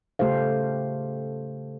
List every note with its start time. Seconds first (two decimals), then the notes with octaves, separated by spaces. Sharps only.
0.19 C#3 A3 G4 A4 C5 F5